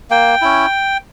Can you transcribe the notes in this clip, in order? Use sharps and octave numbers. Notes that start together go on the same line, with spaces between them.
A#3 G5
C#4 E4